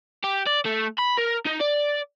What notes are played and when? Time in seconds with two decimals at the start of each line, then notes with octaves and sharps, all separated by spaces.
0.24 G4
0.46 D5
0.65 A3
0.98 B5
1.18 A#4
1.46 D#4
1.60 D5